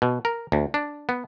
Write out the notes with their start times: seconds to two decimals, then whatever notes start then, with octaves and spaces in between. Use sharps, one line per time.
0.02 B2
0.25 A#4
0.52 D2
0.74 D4
1.09 B3